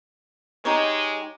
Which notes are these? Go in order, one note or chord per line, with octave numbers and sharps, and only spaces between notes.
G#3 D#4 G4 C#5